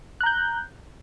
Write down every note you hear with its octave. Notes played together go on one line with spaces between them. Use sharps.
A#5 F#6 G6